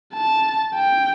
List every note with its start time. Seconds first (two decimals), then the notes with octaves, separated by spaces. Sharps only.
0.14 A5
0.75 G5